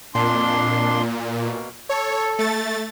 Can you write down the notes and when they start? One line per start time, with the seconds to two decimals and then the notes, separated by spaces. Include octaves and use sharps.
0.15 F2 A#2 D4 C6
1.37 B2 A#3
1.89 A4 C#5
2.39 A3 A6